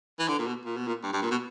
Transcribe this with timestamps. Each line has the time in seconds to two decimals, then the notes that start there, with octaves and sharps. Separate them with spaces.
0.19 E3
0.28 D3
0.39 A#2
0.47 B2
0.65 A#2
0.77 B2
0.87 A#2
1.03 G2
1.13 G2
1.22 A#2
1.31 B2